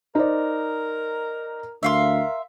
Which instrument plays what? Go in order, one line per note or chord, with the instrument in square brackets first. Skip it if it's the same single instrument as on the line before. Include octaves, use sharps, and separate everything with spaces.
[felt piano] D#4 C5 D5 [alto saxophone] A#4
[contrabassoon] D2 [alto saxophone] A#4 [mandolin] E5 F5 C6